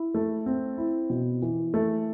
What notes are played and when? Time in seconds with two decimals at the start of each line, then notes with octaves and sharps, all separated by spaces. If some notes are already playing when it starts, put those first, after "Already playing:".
Already playing: E4
0.14 A3
0.46 C4
0.78 E4
1.10 B2
1.42 E3
1.74 A3